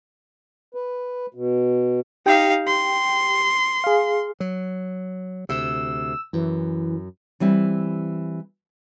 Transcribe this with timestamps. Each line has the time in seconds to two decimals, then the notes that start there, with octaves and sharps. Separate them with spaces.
0.74 B4
1.34 B2
2.26 D#4 G4 F5 G5
2.67 C6
3.84 G#4 F5
4.40 F#3
5.49 D2 C3 E6
6.33 F#2 E3
7.40 E3 G3 C4 E4